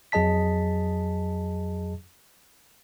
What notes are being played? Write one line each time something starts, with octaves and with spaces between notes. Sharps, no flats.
F2 F#3 G#4 D#5 A5 B6